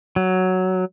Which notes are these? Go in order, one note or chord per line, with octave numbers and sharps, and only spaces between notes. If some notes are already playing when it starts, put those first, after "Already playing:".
F#3